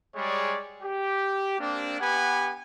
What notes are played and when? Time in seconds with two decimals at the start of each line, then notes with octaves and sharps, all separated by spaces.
0.15 G3 G#3 G#4 C#5 D5
0.82 G4
1.59 A#3 C4 D4
2.00 B3 G4 B4 F#5 G#5